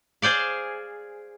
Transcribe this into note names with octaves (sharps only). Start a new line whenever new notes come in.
G#4 C5 D5 F5